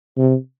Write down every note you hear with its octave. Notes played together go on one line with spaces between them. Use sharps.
C3